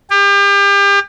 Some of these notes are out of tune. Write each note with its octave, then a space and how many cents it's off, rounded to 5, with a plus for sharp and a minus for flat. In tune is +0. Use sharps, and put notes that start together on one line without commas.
G4 +35